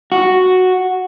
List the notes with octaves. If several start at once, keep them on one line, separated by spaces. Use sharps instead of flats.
F#4